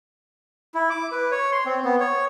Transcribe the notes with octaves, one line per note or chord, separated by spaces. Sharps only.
E4
D6
B4
C#5
C6
C4
B3
C#5